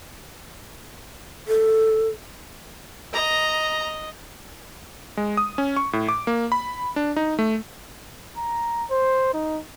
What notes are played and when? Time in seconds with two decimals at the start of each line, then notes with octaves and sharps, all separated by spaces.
1.48 A4
3.13 D#5 A#5
5.17 G#3
5.37 D#6
5.58 C#4
5.76 C#6
5.93 A2
6.09 D6
6.27 A#3
6.52 B5
6.96 D4
7.16 D#4
7.39 A3
8.37 A#5
8.91 C5
9.34 D#4